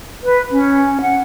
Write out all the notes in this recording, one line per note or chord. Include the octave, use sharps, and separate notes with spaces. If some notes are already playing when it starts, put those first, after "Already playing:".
B4
C#4
F#5